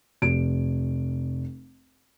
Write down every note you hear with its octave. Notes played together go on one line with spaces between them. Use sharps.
F1 D7